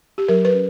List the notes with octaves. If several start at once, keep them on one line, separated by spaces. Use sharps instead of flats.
G4
F#3 A#4
B4
C#4